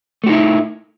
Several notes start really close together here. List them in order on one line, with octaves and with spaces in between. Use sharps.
A3 F#4 D#4 E4